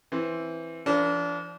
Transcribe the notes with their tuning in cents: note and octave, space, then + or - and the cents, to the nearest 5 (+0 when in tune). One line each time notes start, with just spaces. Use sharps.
E3 +0 C4 +10
F3 -40 D4 -30 A#4 +0